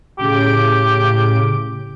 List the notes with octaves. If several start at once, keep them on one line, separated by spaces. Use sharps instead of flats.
A2 C#3 G4 D7